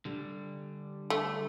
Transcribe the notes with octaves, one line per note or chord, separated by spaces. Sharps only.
D3 G3
A3